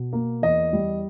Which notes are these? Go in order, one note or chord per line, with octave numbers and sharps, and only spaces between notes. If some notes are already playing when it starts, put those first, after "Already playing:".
Already playing: B2
A#3
E2 D#5
G3